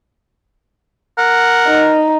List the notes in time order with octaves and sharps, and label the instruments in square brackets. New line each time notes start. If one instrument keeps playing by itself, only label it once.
[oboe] A#4 [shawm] F#5
[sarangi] D#4